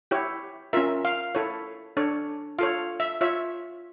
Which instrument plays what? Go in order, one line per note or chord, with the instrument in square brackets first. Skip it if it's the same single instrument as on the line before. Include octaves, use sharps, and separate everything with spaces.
[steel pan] E4 G4 C#5
C#4 F4 A#4 E5
F5
E4 A4 C#5
D4 A4 C#5
F4 A4 C#5 F5
E5
F4 C#5 E5